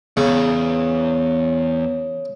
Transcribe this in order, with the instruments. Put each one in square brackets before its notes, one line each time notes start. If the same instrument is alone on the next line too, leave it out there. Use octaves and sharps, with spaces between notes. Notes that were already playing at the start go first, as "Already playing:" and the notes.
[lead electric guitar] E2 [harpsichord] C#3 [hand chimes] B3